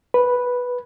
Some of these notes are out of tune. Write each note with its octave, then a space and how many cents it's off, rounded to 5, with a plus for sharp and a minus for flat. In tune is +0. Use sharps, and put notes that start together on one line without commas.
B4 -5